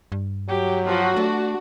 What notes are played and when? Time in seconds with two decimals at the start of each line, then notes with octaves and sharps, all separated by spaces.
0.12 G2
0.49 F#3 G4
0.87 F3 F#4
1.17 A3 D4